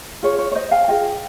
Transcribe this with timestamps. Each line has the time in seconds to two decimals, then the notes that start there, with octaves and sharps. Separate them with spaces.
0.23 F4 G#4 C#5
0.38 C#5
0.51 C#5
0.55 C5 D#5
0.71 F5 G#5
0.88 F4 G#4 D#5 G5